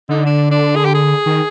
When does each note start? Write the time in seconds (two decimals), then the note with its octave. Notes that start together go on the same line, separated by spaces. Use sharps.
0.09 D3 D#4
0.26 D4
0.51 D4
0.76 G#4
0.85 G4
0.94 G#4
1.26 D#3